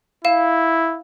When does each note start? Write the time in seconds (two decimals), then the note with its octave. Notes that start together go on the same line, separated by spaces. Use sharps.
0.25 E4 F5 E7